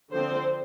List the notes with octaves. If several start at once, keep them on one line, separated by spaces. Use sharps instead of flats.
D3 F3 C4 C5